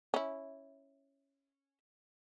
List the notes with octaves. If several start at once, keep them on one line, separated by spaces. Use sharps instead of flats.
C#4 E4